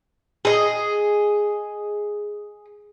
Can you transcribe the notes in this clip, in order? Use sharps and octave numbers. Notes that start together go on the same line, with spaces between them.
G#4 D#5